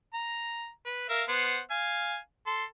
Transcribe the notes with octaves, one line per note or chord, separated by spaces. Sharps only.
A#5
B4
A#4 E5 F5
B3 C5 F#5
F5 G#5
A4 C6